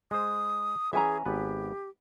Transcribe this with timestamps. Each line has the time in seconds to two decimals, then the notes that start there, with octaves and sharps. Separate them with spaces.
0.11 G#3 C5 D#6
0.93 E3 C#4 G#4 E5 G#5 A#5
1.25 G#1 B3 G4 B4